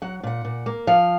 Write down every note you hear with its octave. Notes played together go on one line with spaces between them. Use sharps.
F#3 F#5
A#2 F#5
A#2
A#3
F3 F5